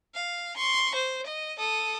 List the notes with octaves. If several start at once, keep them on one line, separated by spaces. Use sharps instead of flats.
F5
C6 C#6
C5
D#5
A4 D#6